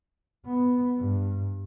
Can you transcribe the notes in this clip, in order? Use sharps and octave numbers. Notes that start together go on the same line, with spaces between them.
B3
G2